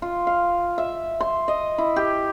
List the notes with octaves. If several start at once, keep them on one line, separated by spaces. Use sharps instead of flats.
F4
F5
E5
C6
D#5
E4
G4